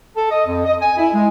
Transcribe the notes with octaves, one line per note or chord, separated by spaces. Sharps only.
A4
D#5
F2
D#5
G#5
E4
G#3